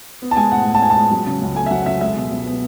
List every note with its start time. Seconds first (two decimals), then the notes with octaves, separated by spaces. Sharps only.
0.22 B3
0.31 A5
0.37 G#3 G#5
0.52 A2 F#5
0.67 A2
0.75 A5
0.82 B3 G#5
0.90 A5
0.96 G#3
1.11 F#3
1.26 C#3
1.42 C#2
1.56 A3 G#5
1.66 E5
1.71 F#3 F#5
1.86 C#3 E5
2.01 G#3 E5
2.16 B2
2.31 C#2
2.46 B3